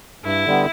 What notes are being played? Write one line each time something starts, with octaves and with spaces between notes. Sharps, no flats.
G2 E4
D3 G3 B3